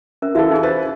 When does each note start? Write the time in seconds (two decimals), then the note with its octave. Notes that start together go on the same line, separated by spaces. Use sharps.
0.22 C#4 A#4 E5
0.35 E3 F#4 A4 E5 F5
0.50 C#4 D#4 G#4
0.63 B4 C5 A6